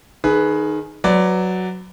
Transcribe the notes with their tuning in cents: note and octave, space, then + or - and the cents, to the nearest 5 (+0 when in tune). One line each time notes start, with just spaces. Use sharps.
D#3 -10 G#4 +20 B4 +0
F#3 +0 B4 +20 D5 +0